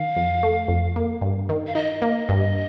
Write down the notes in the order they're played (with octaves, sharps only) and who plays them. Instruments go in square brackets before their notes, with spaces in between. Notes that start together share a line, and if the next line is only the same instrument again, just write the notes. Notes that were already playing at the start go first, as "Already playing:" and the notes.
Already playing: [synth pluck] D#3 [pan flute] F5
[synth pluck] F2
A3
F2
A#3
G2
D#3
[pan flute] F5
[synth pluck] D#4 [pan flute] D#5
[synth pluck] A#3
G2